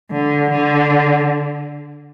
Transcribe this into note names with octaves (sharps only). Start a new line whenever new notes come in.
D3
D3